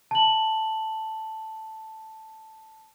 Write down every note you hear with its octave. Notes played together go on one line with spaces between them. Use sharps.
A5 F#7